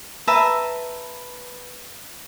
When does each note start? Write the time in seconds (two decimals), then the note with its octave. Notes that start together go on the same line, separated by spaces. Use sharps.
0.27 B4 E5 A5 A#5